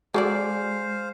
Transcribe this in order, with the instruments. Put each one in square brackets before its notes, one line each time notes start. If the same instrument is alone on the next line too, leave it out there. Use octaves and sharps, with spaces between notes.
[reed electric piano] G#3 [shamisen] F#4 A4 D5 [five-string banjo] G#4 [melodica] C5 F5